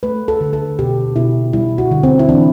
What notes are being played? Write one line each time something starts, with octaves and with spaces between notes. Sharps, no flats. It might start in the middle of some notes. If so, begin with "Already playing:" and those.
A3 B4
A4
D3
A4
B2 G4
B2 E4
G3 E4
F#4
D3
C4
E4
E3 D4